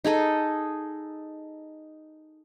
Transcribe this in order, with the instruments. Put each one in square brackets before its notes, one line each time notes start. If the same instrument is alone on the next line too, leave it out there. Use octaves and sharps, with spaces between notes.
[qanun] D#4 G#4 A4 D#5